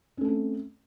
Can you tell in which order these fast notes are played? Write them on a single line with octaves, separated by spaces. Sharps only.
C#4 A3 A4 C4